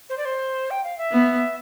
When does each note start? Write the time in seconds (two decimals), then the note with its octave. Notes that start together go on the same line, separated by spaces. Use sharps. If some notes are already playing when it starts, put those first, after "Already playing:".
0.09 C5
0.18 D5
0.25 C5
0.71 G5
0.84 F5
0.98 E5
1.11 B3